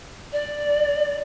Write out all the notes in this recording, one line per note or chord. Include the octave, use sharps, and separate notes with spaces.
D5